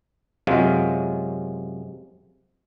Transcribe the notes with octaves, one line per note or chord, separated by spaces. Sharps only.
F#2 C3 F#3 G#3 F4